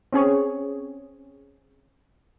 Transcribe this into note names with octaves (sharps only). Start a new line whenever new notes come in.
C4 C#4 G#4 C#5